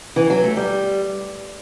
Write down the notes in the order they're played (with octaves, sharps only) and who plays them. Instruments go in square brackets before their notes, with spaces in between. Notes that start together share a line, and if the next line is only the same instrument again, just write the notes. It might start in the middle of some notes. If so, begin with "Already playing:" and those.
[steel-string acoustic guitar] E3
F#3
A3
G3